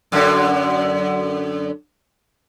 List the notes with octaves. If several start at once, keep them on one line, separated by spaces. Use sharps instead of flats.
F#2 D3